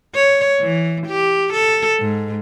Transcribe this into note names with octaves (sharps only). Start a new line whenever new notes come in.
C#5
E3
G4
A4
G#2